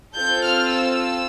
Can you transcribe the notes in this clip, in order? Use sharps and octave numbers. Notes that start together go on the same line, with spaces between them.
C4 F4 A4 G6
F6
E6